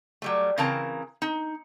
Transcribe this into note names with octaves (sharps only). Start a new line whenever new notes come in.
F#3 G3 A3
C#3 E3 C4 A#4 A5 A#5
D#4